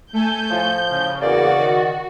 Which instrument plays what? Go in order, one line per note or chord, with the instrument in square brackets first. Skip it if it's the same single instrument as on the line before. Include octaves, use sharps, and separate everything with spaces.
[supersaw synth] A3 A4 G#5 [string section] G6
[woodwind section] A2 F3
[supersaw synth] C#3
[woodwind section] E2 A#3 [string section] F#4 [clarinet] D5
[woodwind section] D#3